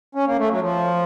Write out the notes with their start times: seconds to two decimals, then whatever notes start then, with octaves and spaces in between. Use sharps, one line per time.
0.15 C#4
0.27 A#3
0.39 A3
0.50 F#3
0.61 F3